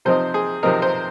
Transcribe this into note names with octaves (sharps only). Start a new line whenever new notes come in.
C3 F3 C4 D#4 C5
G#4
C3 F3 C4 D#4 A#4
C5